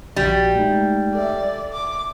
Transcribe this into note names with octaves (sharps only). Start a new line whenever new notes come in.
A#1 G3 F#4
G#3 A3 D#4
A4 D5 E5
D6